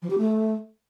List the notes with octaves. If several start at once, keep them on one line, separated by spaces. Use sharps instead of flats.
F3
G4
A3